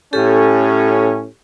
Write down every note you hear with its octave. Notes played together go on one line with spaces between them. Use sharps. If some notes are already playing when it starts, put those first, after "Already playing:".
A2 C#4 G4 A4